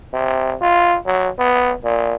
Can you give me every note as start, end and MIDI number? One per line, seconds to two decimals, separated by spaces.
0.13 0.56 48
0.61 0.98 65
1.06 1.29 54
1.39 1.73 59
1.84 2.16 46